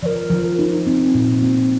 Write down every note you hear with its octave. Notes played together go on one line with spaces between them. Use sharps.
F3 A#4 D5
F3
D#4
C4
A#2
C4